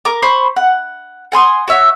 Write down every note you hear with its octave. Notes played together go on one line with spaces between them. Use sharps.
A#4 D6
C5 B5 C#6
F#5
F#5 G#5 C6 D#6
F#4 C#5 E5